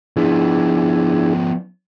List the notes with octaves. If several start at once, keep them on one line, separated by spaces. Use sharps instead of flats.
F3 B3 D4 E4 G#4